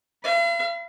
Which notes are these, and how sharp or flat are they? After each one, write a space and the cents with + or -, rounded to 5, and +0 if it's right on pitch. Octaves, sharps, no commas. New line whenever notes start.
F5 -45 B5 +0